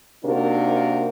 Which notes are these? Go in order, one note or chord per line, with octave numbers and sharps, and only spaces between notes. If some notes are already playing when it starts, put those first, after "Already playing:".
C3 A#3 D4 D#4 F#4 A#4